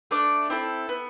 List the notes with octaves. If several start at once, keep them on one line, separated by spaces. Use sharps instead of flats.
A3 D4 D5
C4 E4 A4
B3